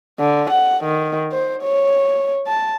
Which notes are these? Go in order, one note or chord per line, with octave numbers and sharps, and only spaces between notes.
D3
F#5
D#3
C5
C#5
A5